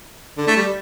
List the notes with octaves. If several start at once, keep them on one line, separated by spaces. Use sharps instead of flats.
D3
A3
G3